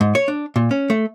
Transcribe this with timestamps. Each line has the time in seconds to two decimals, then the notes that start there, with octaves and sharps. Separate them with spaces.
0.01 G#2
0.15 C#5
0.28 D4
0.56 A#2
0.71 C#4
0.90 A3